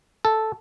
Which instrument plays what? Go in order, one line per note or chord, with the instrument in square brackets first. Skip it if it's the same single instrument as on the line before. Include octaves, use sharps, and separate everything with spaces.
[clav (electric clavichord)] A4